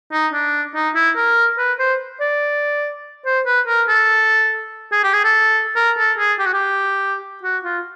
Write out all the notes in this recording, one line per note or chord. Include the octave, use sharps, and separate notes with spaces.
D#4
D4
D#4
E4
A#4
B4
C5
D5
C5
B4
A#4
A4
G#4
G4
G#4
A4
A#4
A4
G#4
G4
F#4
G4
F#4
F4